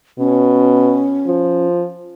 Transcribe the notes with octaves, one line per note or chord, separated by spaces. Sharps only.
B2 C#4
F3